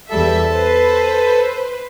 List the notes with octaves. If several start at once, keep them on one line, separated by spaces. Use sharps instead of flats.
E2 G3 A4 E5
B4 C5